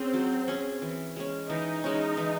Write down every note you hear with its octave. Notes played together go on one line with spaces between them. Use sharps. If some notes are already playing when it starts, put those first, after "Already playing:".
Already playing: C4 C#4 G#4
F#3
C#4 G#4
E3
G#3 C#4
E3 D#4
G#3 C#4
E3